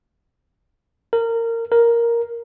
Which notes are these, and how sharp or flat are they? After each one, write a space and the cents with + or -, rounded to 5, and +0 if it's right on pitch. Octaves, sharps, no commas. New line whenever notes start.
A#4 -20
A#4 +5